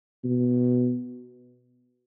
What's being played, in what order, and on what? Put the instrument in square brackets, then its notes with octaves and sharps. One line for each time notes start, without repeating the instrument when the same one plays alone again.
[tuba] B2